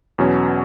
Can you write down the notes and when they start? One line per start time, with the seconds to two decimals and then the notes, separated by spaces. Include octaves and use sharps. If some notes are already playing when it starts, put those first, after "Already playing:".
0.18 E2 B2 F#3 C#4